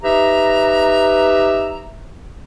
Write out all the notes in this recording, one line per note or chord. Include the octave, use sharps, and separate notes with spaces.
D#4 G4 B4 E5 A#5